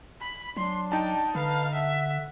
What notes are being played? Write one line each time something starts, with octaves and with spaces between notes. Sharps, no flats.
B5
F#3 D4 C6
D#4 G5 A5
D3 B4 F5
E5 F#5